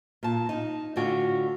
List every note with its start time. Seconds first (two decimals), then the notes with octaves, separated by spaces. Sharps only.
0.23 A#2 A5
0.49 D#4
0.96 A2 D3 F4 F#4 G5